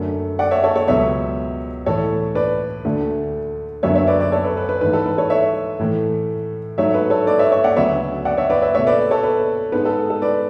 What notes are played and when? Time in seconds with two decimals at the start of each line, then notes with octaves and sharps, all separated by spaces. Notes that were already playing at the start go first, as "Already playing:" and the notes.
Already playing: F#2 D3 A3
0.39 D5 F#5
0.51 C#5 E5
0.63 A4 C#5
0.76 A4 C#5
0.87 C#2 B2 F#3 B3 C#5 E5
1.86 A2 E3 A3 A4 C#5
2.35 B4 D5
2.85 D2 D3 A3
3.83 F#2 D3 F#3 B3 C#5 E5
3.95 C#5 E5
4.07 B4 D5
4.20 B4 D5
4.32 A4 C#5
4.45 B4
4.57 B4
4.69 B4
4.81 G#2 E3 A3 B4
4.93 A4
5.06 B4
5.18 A4 C#5
5.30 C#5 E5
5.79 A2 E3 A3
6.78 G#2 F#3 A3 C#5 E5
6.94 B4
7.10 A4 C#5
7.27 B4 D5
7.39 C#5 E5
7.52 C#5 E5
7.64 D5 F#5
7.76 D2 C#3 F#3 B3 C#5 E5
8.25 D5 F#5
8.37 C#5 E5
8.50 B4 D5
8.62 C#5 E5
8.75 B2 A3 C#5 E5
8.87 B4 D5
9.11 A4 C#5
9.23 B4
9.72 G#2 G#3 B3 B4
9.85 A4
10.10 A4
10.22 B4 D5